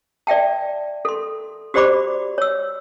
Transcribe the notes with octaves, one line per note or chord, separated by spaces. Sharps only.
D5 E5 G5 A5
A4 C6
F#4 G4 C5 D5 B5 D6
C#5 E6